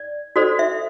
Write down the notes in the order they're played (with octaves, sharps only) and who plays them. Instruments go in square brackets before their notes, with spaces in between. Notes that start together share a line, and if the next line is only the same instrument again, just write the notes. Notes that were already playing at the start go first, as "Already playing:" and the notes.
Already playing: [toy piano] D5
F#4 A4 C5 D5
E5